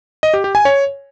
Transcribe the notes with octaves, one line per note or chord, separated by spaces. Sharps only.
D#5
G4
G4
G#5
C#5